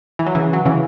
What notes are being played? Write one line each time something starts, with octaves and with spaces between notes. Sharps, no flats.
E3
F#3
C#3 E3
F#3
C#3 E3